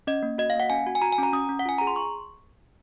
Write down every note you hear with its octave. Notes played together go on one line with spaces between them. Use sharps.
C#4 D#5
A#3
F#4 D#5
F5
A#3 F#5
C#4 G#5
F#4
G#5
F#4 A#5
G#5
C#4 A#5
C#4 D#6
C#4
F#5
F4 G#5
G#4 A#5
C6
C#6